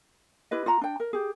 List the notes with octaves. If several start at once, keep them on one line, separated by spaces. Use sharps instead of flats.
E4 G4 B4 D#5
F4 F#5 A#5
D4 G5
A#4
G4 G#4